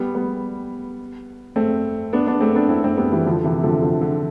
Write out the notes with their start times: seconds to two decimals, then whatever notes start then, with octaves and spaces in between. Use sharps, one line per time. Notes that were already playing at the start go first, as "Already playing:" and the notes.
Already playing: G3 B3
0.15 G3 B3
1.56 A3 C4
2.13 B3 D4
2.27 B3 D4
2.41 A3 C4
2.55 B3 D4
2.69 C4 E4
2.84 A3 C4
2.97 G3 B3
3.12 E3 G3
3.26 D3 F3
3.44 C3 E3
3.63 D3 F3
3.82 D3 F3
4.01 D3